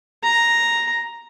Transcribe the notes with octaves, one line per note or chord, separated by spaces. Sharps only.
A#5